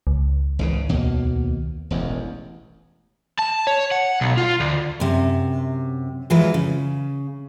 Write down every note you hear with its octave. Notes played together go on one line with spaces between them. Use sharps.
C#2
G#1 C#3 E3
D#2 B2 A#3
E1 A1 E2
A5
C#5
F#5
B1
F4
D2
F#2 C3
G#2 E3 F#3 G#3 F4 B4
C#3